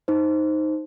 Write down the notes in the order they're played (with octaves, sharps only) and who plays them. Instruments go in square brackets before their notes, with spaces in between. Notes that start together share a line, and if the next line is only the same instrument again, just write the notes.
[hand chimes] D#4 C5